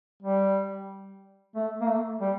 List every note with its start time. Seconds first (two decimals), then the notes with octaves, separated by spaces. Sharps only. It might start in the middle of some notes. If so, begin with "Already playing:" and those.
0.22 G3
1.55 A3
1.81 A#3
1.87 A3
2.21 G3